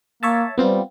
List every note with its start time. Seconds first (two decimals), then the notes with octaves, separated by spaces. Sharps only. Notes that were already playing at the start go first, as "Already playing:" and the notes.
0.23 A#3 C#5 E5 A5
0.58 G3 B3 C4 F4